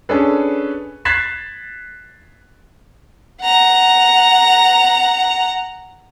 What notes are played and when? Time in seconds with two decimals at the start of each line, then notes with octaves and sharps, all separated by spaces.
0.09 C#4 D4 G#4 A4 B4
1.05 F#6 G#6 A6 B6 C7 E7
3.42 F#5 A#5